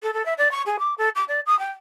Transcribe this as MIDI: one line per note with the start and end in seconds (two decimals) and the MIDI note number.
0.02 0.13 69
0.13 0.25 69
0.25 0.33 76
0.38 0.51 74
0.51 0.62 85
0.66 0.76 68
0.79 0.94 86
0.98 1.09 69
1.15 1.24 86
1.28 1.40 74
1.46 1.57 87
1.59 1.71 79